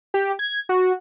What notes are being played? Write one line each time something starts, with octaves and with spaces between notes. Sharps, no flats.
G4
G#6
F#4